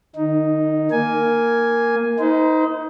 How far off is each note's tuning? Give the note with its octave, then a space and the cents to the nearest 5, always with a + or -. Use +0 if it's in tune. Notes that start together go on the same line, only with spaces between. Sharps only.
D#3 -45 D#4 +0
A#3 +0 G#5 +0
D#4 +20 C5 -35